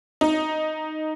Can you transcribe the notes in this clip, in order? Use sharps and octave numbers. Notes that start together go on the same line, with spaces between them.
D#4